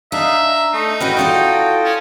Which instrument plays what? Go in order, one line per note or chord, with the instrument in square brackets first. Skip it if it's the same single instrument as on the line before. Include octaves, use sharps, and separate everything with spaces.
[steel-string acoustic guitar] D4 [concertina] D#4 F5 [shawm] E5
[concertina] A#5
[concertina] A3 D#5 [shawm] D#4
[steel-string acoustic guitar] A2 C#4 D#5 [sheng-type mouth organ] F#4 G5 [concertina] B4 F6 F#6
[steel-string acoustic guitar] E4 A4 D5 [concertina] F4 D#6
[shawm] C#4 [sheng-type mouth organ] A5